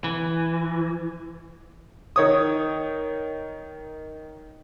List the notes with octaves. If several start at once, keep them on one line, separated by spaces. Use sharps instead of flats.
E3
D#3 C#5 D#6